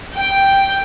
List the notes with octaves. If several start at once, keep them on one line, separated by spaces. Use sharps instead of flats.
G5